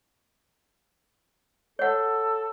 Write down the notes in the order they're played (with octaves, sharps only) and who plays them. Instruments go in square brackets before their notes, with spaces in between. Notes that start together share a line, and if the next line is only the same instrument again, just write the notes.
[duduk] A4 [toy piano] C#5 F#5